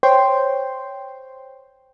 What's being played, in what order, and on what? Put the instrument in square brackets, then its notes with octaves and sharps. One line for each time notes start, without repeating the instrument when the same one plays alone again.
[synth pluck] C5 C#5 G5 C6